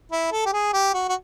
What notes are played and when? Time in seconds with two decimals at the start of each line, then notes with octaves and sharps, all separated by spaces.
0.12 E4
0.32 A4
0.46 G4
0.53 G#4
0.73 G4
0.94 F#4
1.09 F#4